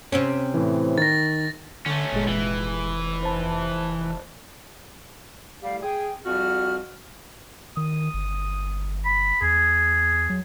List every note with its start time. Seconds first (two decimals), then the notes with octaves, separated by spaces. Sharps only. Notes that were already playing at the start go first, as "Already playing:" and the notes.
0.12 C3 C4 C#4
0.54 A2 E3
0.98 D#3 A6 A#6
1.86 D3 A3 C#4
2.13 G1 A#2 G#3
2.29 F1 E3
3.23 C5 A5 B5
5.63 A2 G3 F5
5.83 G#4 G5
6.26 F2 G3 F#4 F6
7.77 D#3 D#6
8.14 G1
9.05 B5
9.42 E2 G#4
10.30 F#3